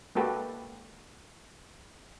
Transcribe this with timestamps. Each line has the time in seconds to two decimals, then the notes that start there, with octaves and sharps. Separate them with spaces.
0.15 G#3 A#3 F#4 G4 A4 B4